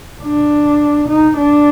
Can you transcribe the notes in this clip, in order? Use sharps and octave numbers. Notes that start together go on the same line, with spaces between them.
D4
D#4
D4